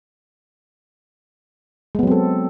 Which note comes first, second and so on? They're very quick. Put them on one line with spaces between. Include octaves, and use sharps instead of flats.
G#3 B3 F#3 C4 A4